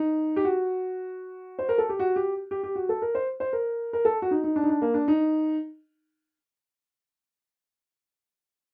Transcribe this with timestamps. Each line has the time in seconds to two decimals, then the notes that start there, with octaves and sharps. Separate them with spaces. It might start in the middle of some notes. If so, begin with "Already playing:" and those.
Already playing: D#4
0.36 G4
0.44 F#4
1.59 C5
1.69 A#4
1.78 A4
1.89 G4
1.99 F#4
2.16 G4
2.51 G4
2.63 G4
2.76 F#4
2.89 A4
3.02 A#4
3.15 C5
3.40 C5
3.53 A#4
3.93 A#4
4.05 A4
4.22 F#4
4.31 D#4
4.44 D#4
4.56 D4
4.63 D#4
4.69 D4
4.82 A#3
4.94 D4
5.08 D#4